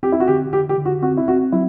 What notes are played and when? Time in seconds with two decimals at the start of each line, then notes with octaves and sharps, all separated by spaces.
0.03 C4 G4
0.12 E4
0.20 F#4
0.28 D3 G4
0.53 D3 G4
0.69 G4
0.78 D3
0.85 F#4
1.02 C4 F#4
1.17 E4
1.28 C4 F#4
1.52 F#3 E4